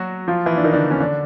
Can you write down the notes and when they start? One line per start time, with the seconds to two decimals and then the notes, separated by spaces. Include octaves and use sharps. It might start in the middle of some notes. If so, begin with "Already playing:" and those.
Already playing: F#3 F#4
0.28 F3 F4
0.46 E3 E4
0.57 D4
0.64 D#3 D#4
0.73 D3 D4
0.91 C#4
1.00 D3 D4